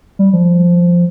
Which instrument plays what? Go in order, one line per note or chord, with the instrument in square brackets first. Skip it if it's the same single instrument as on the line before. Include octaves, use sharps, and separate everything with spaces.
[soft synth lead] G3
F3